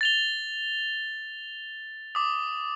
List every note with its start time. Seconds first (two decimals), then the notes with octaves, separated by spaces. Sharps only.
0.01 A6 F7 G7
2.15 D6 D#6